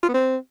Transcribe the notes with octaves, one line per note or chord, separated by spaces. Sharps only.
F4
B3
C4